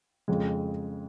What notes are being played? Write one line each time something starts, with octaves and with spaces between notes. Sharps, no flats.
F2 C#3 G#3